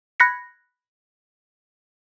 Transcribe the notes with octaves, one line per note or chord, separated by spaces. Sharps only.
B5 F#6 G#6 A#6 B6 C#7